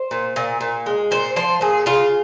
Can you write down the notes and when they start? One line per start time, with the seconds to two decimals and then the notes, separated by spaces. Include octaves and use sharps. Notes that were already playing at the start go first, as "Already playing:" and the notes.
Already playing: C5
0.11 A#2
0.36 A#2
0.61 A#2
0.86 G#3
1.11 A#2 C5
1.36 F3 C5
1.61 A#2 G#4
1.86 C#3 F4